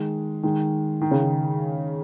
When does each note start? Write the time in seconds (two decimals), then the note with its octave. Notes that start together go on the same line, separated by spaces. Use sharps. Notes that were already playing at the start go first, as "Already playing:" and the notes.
Already playing: D#3 G#3
0.43 D#3 G#3
1.02 D#3
1.11 C#3
1.22 D#3